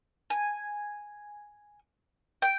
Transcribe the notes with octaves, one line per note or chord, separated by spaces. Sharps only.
G#5
G5